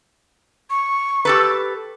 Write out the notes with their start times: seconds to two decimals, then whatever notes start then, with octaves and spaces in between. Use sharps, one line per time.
0.70 C#6
1.25 G4 A4 B4